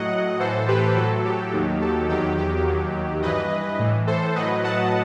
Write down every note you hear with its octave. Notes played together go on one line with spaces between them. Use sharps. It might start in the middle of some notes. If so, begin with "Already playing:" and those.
Already playing: A2 F#3 D#5 F#5
A2 E3 A4 C5
G4 B4
A2 F#3 A4
G4
D#2 D#3 F#3
A4
E2 D#3 F#3 G4
G4
D#2 D#3 F#3
G2 E3 B4 D#5
A2 E3
A4 C5
A2 F#3 B4 D#5
F#5 A5